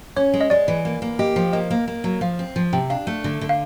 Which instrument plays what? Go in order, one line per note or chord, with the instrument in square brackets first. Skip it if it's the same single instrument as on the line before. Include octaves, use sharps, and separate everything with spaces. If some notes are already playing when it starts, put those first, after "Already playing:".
[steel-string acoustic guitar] C#4 [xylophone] C#5
[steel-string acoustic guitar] G#3
[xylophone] D#5
[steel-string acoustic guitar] G#3 [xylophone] D5
[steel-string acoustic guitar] E3
A#3
A#3
[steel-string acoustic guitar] G4 [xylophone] D#5
[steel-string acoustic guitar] F3
[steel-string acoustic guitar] A#3 [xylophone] D#5
[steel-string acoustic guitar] A#3
A#3
F#3
[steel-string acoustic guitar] F3 [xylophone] F5
[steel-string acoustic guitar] C4
F3
[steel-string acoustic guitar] C3 [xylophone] G5
[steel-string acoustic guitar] D4 [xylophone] F5
[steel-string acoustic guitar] A3
D3
D3
[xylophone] F5